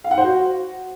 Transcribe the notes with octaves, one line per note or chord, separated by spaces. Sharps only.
F5
F#5
C5
F#4